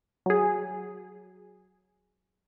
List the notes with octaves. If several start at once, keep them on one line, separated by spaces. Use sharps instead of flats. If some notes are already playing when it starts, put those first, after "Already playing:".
F#3 G#4